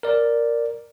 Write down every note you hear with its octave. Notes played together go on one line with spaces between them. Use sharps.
A#4 D5